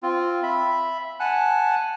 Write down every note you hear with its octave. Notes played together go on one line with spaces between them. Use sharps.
C4 F4
E5 B5
F#5 G#5 A5 F#6